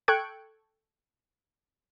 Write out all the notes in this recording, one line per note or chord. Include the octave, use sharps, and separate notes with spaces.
A4 G5 C#6 F#6 G#6 D7